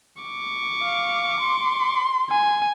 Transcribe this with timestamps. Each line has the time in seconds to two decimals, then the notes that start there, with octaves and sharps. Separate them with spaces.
0.22 C#6 D6
0.82 F5
1.40 C6
2.30 G#5